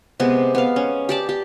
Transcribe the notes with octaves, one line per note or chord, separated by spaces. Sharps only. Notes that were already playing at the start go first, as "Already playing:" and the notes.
C3 G#3 B3
B3 F5
C#4
G4 D5 A5
G4